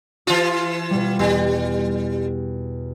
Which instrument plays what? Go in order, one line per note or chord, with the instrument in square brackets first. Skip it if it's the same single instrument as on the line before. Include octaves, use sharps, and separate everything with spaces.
[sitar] E3 F4 [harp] D#6 G#6
[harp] B2 G3
[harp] E2 B2 [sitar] G3